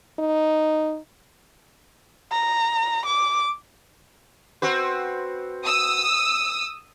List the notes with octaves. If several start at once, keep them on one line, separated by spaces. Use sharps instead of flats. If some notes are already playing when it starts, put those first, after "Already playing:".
D#4
A#5
D6
C4 F#4 B4
D#6 E6